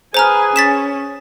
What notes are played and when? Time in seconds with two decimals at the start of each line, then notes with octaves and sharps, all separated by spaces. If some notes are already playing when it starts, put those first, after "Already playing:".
0.14 G#4 B4 C5 G#5 A#5 F6
0.56 C#4 A6 B6 E7